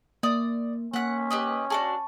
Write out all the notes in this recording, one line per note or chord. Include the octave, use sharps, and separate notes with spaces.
A#3 D5 D#6
A#3 C#4 F#5 F#6 B6
G4 B4 D#5
D4 F#4 G#4 A5 C#6